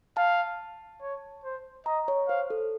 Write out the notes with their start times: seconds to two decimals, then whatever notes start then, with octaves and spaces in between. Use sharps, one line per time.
0.17 F5 A5
1.02 C#5
1.44 C5
1.86 D#5 A#5
2.08 C#5
2.29 C5 F5
2.50 A4